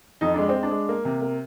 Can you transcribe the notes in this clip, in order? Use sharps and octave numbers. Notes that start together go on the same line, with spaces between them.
F2 D#4
G#3 D4
C4
G#3
D4
G#3
A#3
C3
A#3